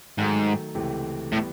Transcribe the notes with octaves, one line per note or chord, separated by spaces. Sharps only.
G#2 D#3 F#3 A3
C#2 C3 E3 A3
A2 E3 G3 B3